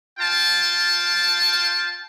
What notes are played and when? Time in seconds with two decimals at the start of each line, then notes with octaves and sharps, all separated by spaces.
0.19 F4 G5 A5